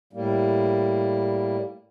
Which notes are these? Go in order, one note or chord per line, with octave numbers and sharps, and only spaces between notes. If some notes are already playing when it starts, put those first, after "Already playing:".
A2 G3 A#3